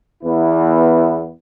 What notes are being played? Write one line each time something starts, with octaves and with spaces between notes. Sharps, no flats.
E2 E3 B3 E4